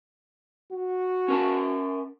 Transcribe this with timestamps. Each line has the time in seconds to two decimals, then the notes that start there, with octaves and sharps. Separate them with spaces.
0.72 F#4
1.28 C#4 A#4 A5